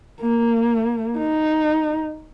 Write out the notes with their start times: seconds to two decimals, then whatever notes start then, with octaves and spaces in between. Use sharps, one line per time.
0.21 A#3
1.18 D#4